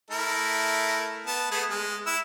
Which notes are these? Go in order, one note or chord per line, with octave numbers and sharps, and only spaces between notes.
A3 E4 A#4
B3 A5
A3 B3 G#4
G#3
E4 E6